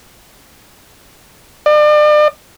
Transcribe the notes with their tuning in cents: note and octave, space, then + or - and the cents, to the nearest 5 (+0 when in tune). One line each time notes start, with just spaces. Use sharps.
D5 +40